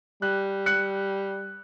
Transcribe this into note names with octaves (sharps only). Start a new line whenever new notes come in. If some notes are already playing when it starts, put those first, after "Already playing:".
G3 F#6
F#6 C#7